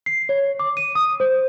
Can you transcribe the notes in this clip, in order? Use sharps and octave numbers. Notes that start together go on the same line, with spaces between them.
C7
C#5
D6
D#7
D#6
C5